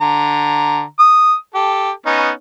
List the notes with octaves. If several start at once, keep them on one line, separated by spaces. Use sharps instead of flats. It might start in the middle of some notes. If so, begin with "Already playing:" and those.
D3 A#5
D#6
G4 A4
B3 C#4 D#4